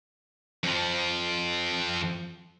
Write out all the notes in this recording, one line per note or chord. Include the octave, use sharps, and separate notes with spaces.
F2 F3